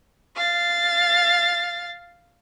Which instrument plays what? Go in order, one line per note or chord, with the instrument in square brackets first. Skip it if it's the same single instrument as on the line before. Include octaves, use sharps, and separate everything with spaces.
[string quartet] F5 A6